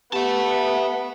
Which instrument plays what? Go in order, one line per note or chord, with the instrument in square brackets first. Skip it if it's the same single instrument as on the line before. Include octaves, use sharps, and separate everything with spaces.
[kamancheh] B3 [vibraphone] G4 [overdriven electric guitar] E5 A5